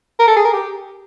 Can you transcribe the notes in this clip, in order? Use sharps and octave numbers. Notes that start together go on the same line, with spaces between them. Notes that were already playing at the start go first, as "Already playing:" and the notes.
A#4
A4
G#4
A#4
G4